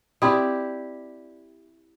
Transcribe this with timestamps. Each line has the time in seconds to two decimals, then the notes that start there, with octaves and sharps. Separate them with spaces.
0.22 C4 E4 G4 D5 B5 D#6